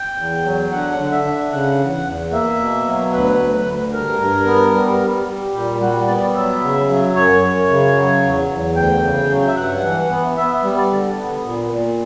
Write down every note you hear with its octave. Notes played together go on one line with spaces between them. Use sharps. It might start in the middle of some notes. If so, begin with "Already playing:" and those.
Already playing: G5
E2
F#3
D3 F#5
D3
E5
D3
C#3 F#5
E2
E2
A#3 E5
B2
F#3
D2 B4
D2
D2
G2 A#4
G2
B3
G3
G3
G3
A#2 G4
G3 F#4
B3 D5
F#3 E5
C#3
F#3
F#2 C#5
F#2
C#3
F#3
E2
E2
D2 G5
C#3
F#3
E5
G2 F#5
E3
B3
B3 E5
G3
D5
D3
B3
A#2
A#2